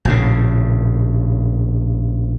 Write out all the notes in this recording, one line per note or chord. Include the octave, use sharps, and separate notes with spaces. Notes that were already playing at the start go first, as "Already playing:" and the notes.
A#1 A2 C#3